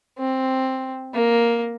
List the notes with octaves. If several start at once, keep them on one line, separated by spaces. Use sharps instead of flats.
C4
A#3